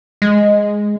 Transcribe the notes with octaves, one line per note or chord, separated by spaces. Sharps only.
G#3